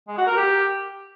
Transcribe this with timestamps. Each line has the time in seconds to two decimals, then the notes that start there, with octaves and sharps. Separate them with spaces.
0.08 G#3
0.18 F#4
0.27 A#4
0.37 G4